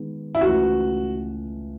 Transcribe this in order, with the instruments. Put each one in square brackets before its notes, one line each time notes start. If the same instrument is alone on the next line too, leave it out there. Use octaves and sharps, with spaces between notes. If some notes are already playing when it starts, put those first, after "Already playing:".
Already playing: [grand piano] D#3 G#3 B3
[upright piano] E4
[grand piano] C#2 C#3 E3 A3 [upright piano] F#4